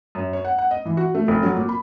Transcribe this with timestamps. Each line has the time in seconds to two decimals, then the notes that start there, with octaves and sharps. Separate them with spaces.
0.15 F#2
0.33 C#5
0.45 F#5
0.58 F#5
0.71 D#5
0.85 E3
0.97 F#4
1.15 A3
1.28 F1
1.43 F#3
1.56 A#2
1.69 B5